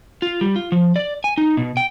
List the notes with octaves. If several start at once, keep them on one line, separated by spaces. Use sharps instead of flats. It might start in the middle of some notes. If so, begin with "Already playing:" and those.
F4
G3
F4
F3
D5
G#5
D#4
B2
G5